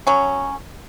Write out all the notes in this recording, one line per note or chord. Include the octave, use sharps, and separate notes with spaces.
F#3 C#4